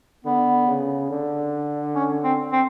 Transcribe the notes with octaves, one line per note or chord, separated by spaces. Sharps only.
D3 B3
C#3
D3
C#4
C4
C4